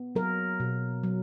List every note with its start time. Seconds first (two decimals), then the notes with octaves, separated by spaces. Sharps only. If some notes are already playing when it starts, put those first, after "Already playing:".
Already playing: B3
0.15 F#3 A#4
0.60 B2
1.03 F#3